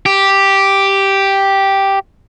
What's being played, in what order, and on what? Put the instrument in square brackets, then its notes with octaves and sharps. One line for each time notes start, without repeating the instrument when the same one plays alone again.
[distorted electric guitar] G4